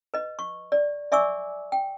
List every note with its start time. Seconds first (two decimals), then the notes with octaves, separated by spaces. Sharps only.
0.14 B4 D#5
0.39 C#6
0.72 D5
1.12 D5 E5 G#5 C#6 D6 E6
1.72 G5